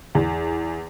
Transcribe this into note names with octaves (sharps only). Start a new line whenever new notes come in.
E2